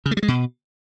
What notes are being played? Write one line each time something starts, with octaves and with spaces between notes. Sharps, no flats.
C#3
A3
G3
G#3
B2